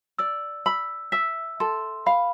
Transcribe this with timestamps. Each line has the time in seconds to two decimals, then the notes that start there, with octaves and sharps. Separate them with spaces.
0.18 D5 E6
0.66 B5 E6
1.12 E5 E6
1.60 A4 C6
2.06 F5 B5